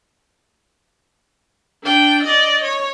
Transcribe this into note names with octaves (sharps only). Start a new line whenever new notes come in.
D4 G5
D5 D#5
C#5